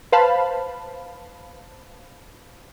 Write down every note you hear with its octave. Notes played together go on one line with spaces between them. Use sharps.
B4 C5 F5 A5 B5